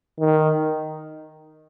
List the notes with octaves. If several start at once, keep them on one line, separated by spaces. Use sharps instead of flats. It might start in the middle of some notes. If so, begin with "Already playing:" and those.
D#3